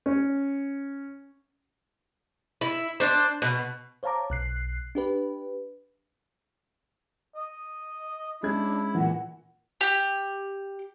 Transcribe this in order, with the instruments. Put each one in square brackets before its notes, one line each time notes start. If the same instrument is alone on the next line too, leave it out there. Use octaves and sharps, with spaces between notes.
[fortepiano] C#4
[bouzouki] E4
D4 C5
B2
[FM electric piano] C5 C#5 F5 A5 A#5 D6
B1 F#6 C7
D4 G4 B4
[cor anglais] D#5
[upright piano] G#3 C#4 G#6 [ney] D4 [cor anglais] E4
[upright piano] A#2 E3 [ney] F#5
[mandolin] G4